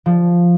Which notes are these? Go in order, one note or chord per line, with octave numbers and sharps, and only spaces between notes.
F3